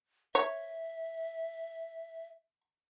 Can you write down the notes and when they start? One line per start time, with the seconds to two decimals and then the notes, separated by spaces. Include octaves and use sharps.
0.35 C#5 E5